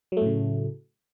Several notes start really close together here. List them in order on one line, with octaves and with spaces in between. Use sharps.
F#3 A3 A2 C#3